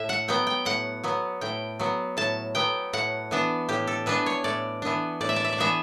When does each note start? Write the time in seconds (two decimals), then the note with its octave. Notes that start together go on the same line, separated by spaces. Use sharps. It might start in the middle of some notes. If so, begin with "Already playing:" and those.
Already playing: A2 E5
0.09 F#5
0.28 F#3 B3 G5
0.47 G5
0.65 A2 F#5
1.04 F#3 B3
1.41 A2 G5
1.79 F#3 B3
2.17 A2 A5
2.55 F#3 B3 G5
2.93 A2 F#5
3.31 E3 B3 D4
3.69 A2 G4
3.87 A4
4.06 E3 B3 D4 B4
4.26 C#5
4.44 A2 D5
4.82 E3 B3 D4
5.21 A2 D5
5.29 E5
5.36 D5
5.45 E5
5.53 D5
5.58 E3 B3 D4 E5